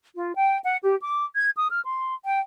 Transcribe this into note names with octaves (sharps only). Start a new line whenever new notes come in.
F4
G5
F#5
G4
D6
G#6
D#6
F6
C6
G5